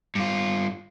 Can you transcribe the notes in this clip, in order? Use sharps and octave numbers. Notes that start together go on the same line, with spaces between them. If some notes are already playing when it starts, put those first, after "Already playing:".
G2 F4